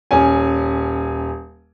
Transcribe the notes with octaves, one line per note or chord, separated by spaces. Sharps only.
D#1 C#4 G#5